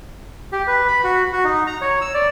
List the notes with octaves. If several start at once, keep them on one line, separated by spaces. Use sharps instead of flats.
G4
B4
B5
F#4
F#4
D#4
A#5
C#5
E6
D5